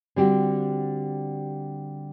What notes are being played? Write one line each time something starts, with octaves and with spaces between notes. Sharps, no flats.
D3 G3 C4 F#4 G4